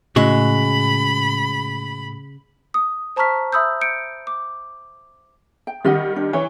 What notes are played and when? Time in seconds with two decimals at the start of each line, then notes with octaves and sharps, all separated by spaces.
0.16 A2 C#3 G#3 F#4 B5
2.74 D#6
3.16 C5 A5 A#5 C#6 F6 B6
3.52 E5 B5 D#6 E6 G6
3.81 G6 C#7 D7
4.27 D6
5.67 G5
5.85 D#3 G3 G4 D#5 F#5
6.16 D4
6.33 E3 C#5